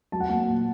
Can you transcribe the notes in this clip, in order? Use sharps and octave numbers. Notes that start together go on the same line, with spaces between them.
F#3 A5
F#5
A#3 A5
A#2